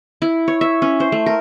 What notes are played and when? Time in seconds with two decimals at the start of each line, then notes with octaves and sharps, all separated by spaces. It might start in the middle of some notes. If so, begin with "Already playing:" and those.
0.22 E4
0.48 C#5
0.61 E5
0.82 C#4
1.00 C5
1.12 A3
1.26 A#4